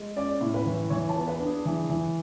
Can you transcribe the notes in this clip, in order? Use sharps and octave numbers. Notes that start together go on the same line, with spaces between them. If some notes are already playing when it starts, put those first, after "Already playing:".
Already playing: G#3
C#4 D5
A2
B4
E3
E3 C#5
A5
B3
B4
D4
G#4
E3
E3